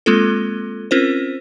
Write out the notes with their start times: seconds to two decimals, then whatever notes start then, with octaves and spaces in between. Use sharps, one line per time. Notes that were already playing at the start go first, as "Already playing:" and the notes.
0.06 G#3 A#3 C4 F4 A4
0.91 C4 C#4 F4 A#4 C5